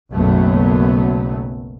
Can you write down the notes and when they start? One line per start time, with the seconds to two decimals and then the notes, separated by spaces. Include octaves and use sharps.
0.13 F#1 B1 F#2 F#3 A3 B3